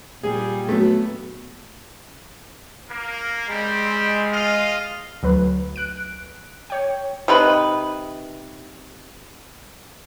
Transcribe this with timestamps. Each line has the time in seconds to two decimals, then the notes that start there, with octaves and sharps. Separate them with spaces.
0.23 A#2 G3 G#4
0.69 F#3 A3 B3
2.89 A#3
3.49 G3 G#3 C4
4.31 F4 D#5 F5
5.23 D2 F#3 B4
5.76 F#6 D7
6.70 C#5 G5
7.28 C3 D#4 B4